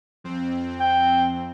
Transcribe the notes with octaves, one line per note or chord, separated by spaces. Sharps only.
F2 C4
G5